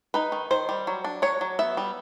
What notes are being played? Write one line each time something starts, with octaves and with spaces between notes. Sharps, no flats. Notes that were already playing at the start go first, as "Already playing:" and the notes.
D#4 B4
D#3
D#3 C5
G3
F#3
D4
F#3 C#5
F#3
B3 E5
G3